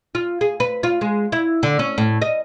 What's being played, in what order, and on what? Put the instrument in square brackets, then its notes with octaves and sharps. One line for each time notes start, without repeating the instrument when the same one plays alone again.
[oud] F4
G#4
B4
F4
G#3
E4
D3
C#4
A2
D#5